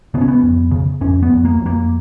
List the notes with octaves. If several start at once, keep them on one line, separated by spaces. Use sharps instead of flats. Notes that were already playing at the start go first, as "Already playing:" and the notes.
C#3 B3
C#4
B3
F2
C#3
F2 C#4
B3
F2
A#3
F2
A#3